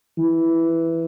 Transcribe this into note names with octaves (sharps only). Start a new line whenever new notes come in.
E3